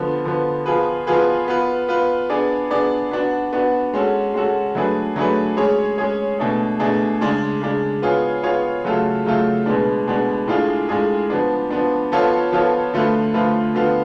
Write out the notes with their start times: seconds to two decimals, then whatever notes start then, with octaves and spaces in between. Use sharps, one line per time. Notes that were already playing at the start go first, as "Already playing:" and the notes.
Already playing: D3 F3 B3
0.25 D3 F3 B3
0.66 F3 B3 F4 G#4 B4
1.07 F3 B3 F4 G#4 B4
1.48 B3 F4 B4
1.89 B3 F4 B4
2.30 B3 D4 G#4 D5
2.71 B3 D4 G#4 D5
3.11 B3 D4 F#4
3.53 B3 D4 F#4
3.93 G#3 C#4 F#4 A4
4.34 G#3 C#4 F#4 A4
4.75 F#3 A3 D4 G#4 B4
5.16 F#3 A3 D4 G#4 B4
5.57 G#3 C#4 G#4 C#5
5.98 G#3 C#4 G#4 C#5
6.39 B2 A3 D4 G#4
6.79 B2 A3 D4 G#4
7.21 C#3 G#3 D4
7.61 C#3 G#3 D4
8.02 B3 F4 G#4 C#5
8.43 B3 F4 G#4 C#5
8.84 C#3 F#3 A3 F4 A4
9.25 C#3 F#3 A3 F4 A4
9.66 B2 G#3 B3 D4
10.07 B2 G#3 B3 D4
10.48 A2 G#3 D4 F4 G#4
10.89 A2 G#3 D4 F4 G#4
11.30 F3 B3 D4
11.70 F3 B3 D4
12.12 F3 B3 F4 A4 C#5
12.52 F3 B3 F4 A4 C#5
12.94 D3 F3 A3 F4 B4
13.34 D3 F3 A3 F4 B4
13.75 D3 F3 B3 F4